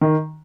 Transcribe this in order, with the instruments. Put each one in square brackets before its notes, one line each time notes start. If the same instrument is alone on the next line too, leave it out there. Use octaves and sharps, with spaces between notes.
[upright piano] D#3